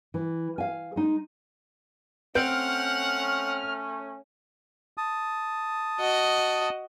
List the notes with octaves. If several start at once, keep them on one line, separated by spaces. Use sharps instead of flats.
E3
F5 G#5
G#3 D#4
A3 C4 C#4 F#5 F6 G6 D7
A5 D#6
F#4 D#5